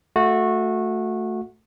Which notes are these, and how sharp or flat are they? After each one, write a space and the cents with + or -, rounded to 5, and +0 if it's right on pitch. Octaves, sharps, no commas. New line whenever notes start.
A3 +0 F#4 -20